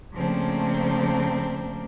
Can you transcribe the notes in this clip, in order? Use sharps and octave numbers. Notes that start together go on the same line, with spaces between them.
C#3 F3 A3 A#3 C4 D4